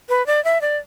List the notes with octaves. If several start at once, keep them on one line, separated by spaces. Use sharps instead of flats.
B4
D5
E5
D5